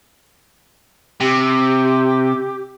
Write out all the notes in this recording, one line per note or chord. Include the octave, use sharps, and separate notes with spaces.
C3 G4